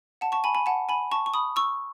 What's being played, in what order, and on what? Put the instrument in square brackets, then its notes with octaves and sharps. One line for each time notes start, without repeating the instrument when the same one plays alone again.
[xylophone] F#5 A5
A5 C#6
G#5 B5
G#5 B5
F#5 A5
G#5 B5
A5 C#6
C#6
B5 D#6
C#6 E6